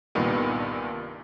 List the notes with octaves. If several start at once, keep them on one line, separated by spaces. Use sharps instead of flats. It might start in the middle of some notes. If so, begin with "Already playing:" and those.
C2 G2 A#2 D#3 B3